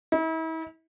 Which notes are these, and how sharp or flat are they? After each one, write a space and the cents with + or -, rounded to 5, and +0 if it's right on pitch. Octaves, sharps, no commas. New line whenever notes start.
E4 -40